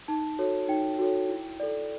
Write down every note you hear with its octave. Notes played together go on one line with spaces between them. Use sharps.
D#4 A5
F#4 A4 C#5
D#4 G5
F#4 A4 C#5
E4
A4 D5